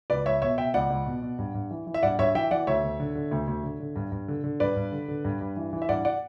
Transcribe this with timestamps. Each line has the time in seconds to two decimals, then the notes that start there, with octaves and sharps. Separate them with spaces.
0.10 C#2 B4 D5
0.26 C#2 C#5 E5
0.42 B2 C#5 E5
0.58 B2 E5 G5
0.74 C#2 D5 F#5
0.90 C#2
1.06 B2
1.22 B2
1.39 G2
1.54 G2
1.71 E3
1.87 E3
1.94 E5
2.03 G2 D5 F#5
2.19 G2 C#5 E5
2.35 E3 E5 G5
2.51 E3 D5 F#5
2.67 D2 C#5 E5
2.84 D2
3.00 D3
3.15 D3
3.31 D2
3.47 D2
3.63 D3
3.80 D3
3.96 G2
4.12 G2
4.28 D3
4.44 D3
4.60 G2 B4 D5
4.76 G2
4.92 D3
5.08 D3
5.25 G2
5.41 G2
5.56 E3
5.73 E3
5.82 E5
5.89 G2 D5 F#5
6.05 D5 F#5